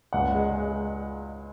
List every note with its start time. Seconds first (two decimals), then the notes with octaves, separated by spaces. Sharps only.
0.13 C#2 F#5
0.35 G#3
0.56 G#3